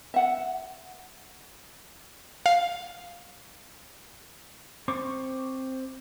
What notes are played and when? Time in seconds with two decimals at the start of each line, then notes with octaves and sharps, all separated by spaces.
0.14 E5 F#5
2.46 F5
4.88 C4 C5 C#6 D6